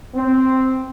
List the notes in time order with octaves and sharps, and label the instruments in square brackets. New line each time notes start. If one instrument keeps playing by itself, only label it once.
[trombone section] C4